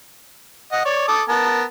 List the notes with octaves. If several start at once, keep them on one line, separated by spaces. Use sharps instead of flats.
D#5 F#5
C#5 D5
A4 D6 D#6
B3 A#4 A5